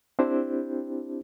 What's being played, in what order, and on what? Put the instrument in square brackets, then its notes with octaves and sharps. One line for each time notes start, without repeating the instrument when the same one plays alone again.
[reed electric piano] C4 D4 E4 G4 C5